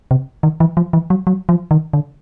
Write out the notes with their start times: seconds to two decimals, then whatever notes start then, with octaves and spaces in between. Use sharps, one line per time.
0.11 C3
0.43 D#3
0.60 E3
0.77 F3
0.93 E3
1.10 F#3
1.27 F#3
1.49 F3
1.71 D#3
1.93 D3